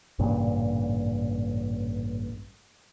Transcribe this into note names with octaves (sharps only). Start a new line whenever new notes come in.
A1 G2 A#2 C#3